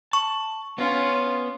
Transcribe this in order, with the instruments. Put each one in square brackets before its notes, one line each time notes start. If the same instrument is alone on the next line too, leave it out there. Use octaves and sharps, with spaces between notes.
[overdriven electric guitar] A5 [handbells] C#6
[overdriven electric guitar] B3 [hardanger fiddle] C#4 F4